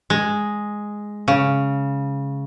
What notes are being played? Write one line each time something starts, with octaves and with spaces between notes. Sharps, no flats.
G#3
C#3